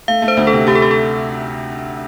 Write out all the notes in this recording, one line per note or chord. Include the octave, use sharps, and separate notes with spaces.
A3 F5
A3
C5
D2
A4
C3
A3 G4
A4
G4
A4